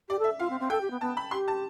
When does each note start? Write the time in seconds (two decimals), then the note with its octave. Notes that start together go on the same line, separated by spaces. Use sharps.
0.09 G4 D5
0.19 A4 E5
0.39 F4 F5
0.50 C4
0.60 C4
0.70 A4 G5
0.81 G4
0.91 B3
1.01 B3 A5
1.17 B5
1.31 G4 C6
1.48 A5